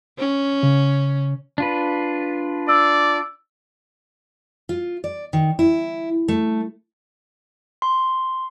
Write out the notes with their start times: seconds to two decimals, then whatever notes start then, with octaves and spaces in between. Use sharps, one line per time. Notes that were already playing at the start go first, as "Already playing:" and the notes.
0.18 C#4
0.63 C#3
1.58 D4 F4 B4
2.69 D5 E6
4.69 F4
5.04 D5
5.33 D#3
5.59 E4
6.28 A3
7.82 C6